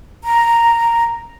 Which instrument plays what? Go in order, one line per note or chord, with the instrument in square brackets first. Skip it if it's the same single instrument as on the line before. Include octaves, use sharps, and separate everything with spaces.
[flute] A#5